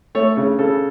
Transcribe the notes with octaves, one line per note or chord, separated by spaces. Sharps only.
A3 C#5
C#3
C#3 A4